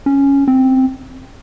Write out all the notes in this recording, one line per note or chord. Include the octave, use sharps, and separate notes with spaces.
C#4
C4